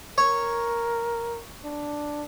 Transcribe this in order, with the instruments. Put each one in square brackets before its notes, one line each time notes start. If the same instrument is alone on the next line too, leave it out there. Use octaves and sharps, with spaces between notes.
[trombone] A#4 [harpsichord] C#5
[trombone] D4